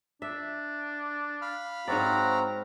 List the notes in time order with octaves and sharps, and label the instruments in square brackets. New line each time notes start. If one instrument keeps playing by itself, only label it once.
[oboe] D4 [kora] E5
[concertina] F5 B5 F6
[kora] G#2 C#5 D5 [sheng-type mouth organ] C4 A#5 [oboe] F#4